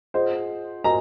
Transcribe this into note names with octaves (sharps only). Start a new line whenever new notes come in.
F4 G#4 C5 D#5 F#5
F#4 A#4 D#5 G#5 A#5